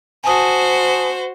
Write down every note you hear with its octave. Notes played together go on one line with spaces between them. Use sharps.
F#4 C5 G#5 A5 D#6